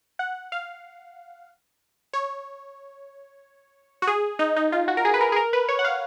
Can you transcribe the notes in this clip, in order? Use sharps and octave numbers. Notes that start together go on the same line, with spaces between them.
F#5
F5
C#5
F#4
G#4
D#4
D#4
F4
F#4
A#4
G#4
B4
A#4
G#4
A#4
B4
C#5
F#5
F5